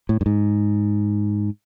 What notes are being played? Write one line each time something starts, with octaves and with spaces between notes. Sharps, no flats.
A2
G2
G#2